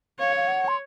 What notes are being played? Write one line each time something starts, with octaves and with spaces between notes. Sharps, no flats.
C#5 F5
F5
F#5
C6